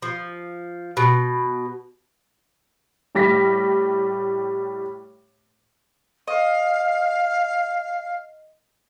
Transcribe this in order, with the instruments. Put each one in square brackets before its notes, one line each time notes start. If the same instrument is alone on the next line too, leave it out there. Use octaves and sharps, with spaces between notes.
[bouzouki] F3
B2
[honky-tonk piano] A2 G3 A#6 B6
[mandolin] D#5 [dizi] F5